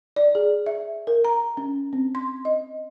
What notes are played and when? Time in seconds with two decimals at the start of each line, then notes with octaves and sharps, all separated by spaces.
0.16 D5
0.35 G#4
0.66 E5
1.07 A#4
1.25 A#5
1.57 C#4
1.93 C4
2.15 C6
2.45 D#5